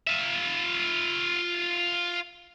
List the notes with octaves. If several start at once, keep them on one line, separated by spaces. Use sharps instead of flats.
F4 E5